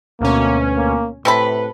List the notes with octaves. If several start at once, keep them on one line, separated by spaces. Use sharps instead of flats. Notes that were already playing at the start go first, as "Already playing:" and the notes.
D2 B2 A#3 C#4
A#3
A2 C3 A4 B4 B5